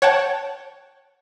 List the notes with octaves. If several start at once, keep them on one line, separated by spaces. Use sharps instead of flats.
C#5 F#5 G5 A5